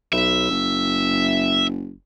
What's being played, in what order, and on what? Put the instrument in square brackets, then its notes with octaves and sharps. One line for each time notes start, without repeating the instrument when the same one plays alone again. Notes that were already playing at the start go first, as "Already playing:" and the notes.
[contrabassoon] B1 [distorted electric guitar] E5
[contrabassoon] F#1